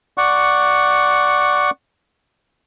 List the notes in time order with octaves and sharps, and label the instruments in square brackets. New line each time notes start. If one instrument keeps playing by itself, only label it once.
[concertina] D5 F#5 C#6